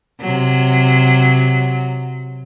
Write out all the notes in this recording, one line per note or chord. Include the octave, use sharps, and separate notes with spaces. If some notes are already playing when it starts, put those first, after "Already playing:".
C3 F#3